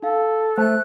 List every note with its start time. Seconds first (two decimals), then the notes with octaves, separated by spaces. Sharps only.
0.02 D#4 A4 F5
0.57 A3 C5 F#6